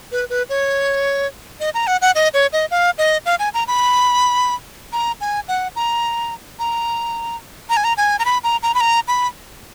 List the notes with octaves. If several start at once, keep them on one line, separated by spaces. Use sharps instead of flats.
B4
B4
C#5
D#5
A#5
F#5
F#5
D#5
C#5
D#5
F5
D#5
F5
G#5
A#5
B5
A#5
G#5
F#5
A#5
A#5
A#5
G#5
A#5
G#5
A#5
B5
A#5
A#5
B5
A#5
B5